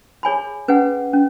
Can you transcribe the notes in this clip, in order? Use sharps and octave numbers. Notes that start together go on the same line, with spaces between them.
G#4 C#5 G#5 B5
C#4 G#4 B4 F#5
C#4